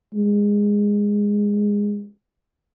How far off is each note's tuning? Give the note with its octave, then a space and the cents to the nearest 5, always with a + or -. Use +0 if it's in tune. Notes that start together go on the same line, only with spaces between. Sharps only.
G#3 -15